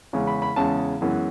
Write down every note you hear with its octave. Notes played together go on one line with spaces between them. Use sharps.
E2 C#3 G#3 C#4
B5
B5
E2 C#3 G#3 C#4 A5
F#2 E3 G#3 B3